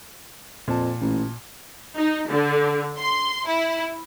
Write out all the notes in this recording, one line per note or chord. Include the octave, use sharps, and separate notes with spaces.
F2 A#2 A5
A1
D#4
D3
C6
E4